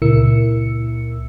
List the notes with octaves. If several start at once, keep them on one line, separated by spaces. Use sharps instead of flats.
C#2 A#2 E4 A#4 E6 C#7